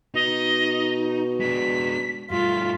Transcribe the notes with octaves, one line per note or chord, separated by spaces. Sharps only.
B2 D#4 D#5
G#3 D4 B6
G2 A3 F4 B6